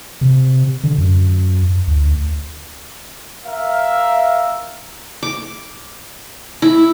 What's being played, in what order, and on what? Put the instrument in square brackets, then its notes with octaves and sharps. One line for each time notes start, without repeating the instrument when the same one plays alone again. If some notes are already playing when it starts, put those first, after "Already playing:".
[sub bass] C3
D3
F#2
D2
[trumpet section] A#4 E5 F5
[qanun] D6
E4